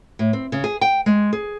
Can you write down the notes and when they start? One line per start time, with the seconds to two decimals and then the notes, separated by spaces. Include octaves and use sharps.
0.19 A2
0.33 C4
0.52 C#3
0.64 G#4
0.81 G5
1.06 G#3
1.33 G#4